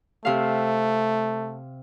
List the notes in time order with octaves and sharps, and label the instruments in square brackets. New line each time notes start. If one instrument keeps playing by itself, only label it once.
[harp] C3 F5 [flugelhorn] A3